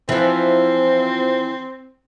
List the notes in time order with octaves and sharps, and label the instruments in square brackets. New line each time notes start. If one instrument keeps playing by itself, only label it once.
[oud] E3 F3 [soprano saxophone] C4